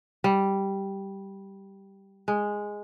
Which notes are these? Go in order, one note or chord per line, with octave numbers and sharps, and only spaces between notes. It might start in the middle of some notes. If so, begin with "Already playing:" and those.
G3
G#3